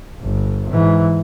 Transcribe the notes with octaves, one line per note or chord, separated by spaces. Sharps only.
G1
G#2 E3